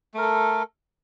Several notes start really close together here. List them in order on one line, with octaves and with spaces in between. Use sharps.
A3 A#4 A4